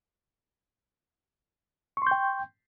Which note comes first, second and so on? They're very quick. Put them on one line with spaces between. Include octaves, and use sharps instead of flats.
C#6 C6 G6 G5